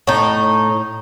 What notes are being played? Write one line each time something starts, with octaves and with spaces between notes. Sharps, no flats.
A2 D#4